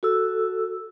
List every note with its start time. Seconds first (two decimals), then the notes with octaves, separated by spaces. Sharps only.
0.03 F#4 A4 E6